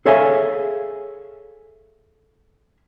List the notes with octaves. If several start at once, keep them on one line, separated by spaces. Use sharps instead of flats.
G#4 A4 C#5 E5 F5 G#5